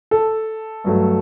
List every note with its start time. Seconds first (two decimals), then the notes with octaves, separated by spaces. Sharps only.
0.11 A4
0.84 G2 F#3 A3